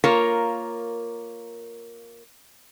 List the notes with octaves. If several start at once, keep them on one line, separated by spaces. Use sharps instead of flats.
A#3 F4 A#4 C#5